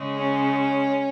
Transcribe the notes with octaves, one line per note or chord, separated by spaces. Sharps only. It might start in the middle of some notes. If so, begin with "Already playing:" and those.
Already playing: C#3 G#3
C#4